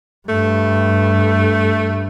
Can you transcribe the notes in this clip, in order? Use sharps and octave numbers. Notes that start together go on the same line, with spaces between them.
G2 A3